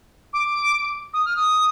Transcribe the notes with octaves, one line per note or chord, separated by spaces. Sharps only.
D6
D#6
F6
D#6